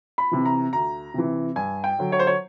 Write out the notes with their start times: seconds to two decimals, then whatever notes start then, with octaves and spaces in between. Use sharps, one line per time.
0.18 B5
0.32 C3 E3
0.46 A#5
0.73 D2 A#5
1.14 C3 E3
1.56 G2 G#5
1.84 G5
1.99 D3 F#3
2.12 C#5
2.19 C5
2.27 C#5